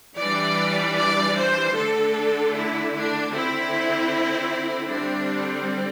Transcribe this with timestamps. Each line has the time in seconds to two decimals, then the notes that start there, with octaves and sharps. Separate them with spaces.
0.18 E3 G3 D4 D5
0.97 D5
1.37 C5
1.75 D3 A3 D4 A4
2.55 E4
2.94 D4
3.32 D3 C4 E4
4.90 D3 G3 C4 D4